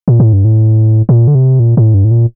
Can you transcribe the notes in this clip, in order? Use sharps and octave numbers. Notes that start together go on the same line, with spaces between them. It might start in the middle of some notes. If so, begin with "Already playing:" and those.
A#2
A2
G2
A2
A#2
D3
C3
A#2
A2
G2
A2
A#2